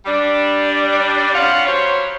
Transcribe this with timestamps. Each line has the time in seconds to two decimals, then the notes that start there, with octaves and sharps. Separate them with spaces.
0.06 G3 D4
1.34 F3 C4 C#4 F4 F5 F#5
1.65 F#3 G3 C5 C#5